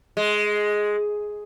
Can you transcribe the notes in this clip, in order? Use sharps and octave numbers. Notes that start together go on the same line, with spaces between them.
G#3